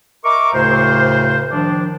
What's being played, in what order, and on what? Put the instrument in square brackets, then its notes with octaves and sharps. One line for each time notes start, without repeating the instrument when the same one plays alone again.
[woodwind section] A#4 D#5 E5 A#5 C#6 D6
D2 A2 C#3 A#4 C5
D#3 F3 D4